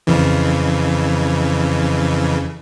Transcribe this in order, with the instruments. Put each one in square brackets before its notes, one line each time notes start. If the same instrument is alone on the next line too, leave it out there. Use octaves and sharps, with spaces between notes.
[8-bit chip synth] F2 C#3 E3